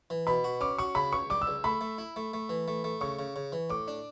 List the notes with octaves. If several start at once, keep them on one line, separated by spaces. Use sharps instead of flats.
E3
B2 B5
F#4
C#4 D6
F#4 C#6
C#3 B5
C#2 C#6
G3 D6
E6
C#2
A3 B5
A3
E4
A3
A3
E3
A3
A3
C#3 C#6
C#3
C#3
E3
A2 D6
D4